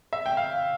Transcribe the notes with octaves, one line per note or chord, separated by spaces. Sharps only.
E5
G5
F5